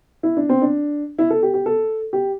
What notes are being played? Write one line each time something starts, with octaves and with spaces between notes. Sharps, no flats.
E4
D4
C4
D4
E4
A4
G4
G4
A4
G4